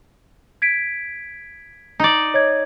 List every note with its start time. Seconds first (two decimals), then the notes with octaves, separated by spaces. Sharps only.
0.62 G#6 B6 D7
2.00 D#4 D5
2.34 C#5 D#5 G#6